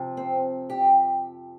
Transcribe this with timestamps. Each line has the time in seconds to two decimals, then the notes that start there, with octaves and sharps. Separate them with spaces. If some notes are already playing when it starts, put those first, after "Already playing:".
Already playing: F2 C3 F3
0.17 C4
0.70 G4